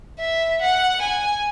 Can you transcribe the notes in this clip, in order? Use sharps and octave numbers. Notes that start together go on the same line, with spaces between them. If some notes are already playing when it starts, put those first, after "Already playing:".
E5
F#5
G#5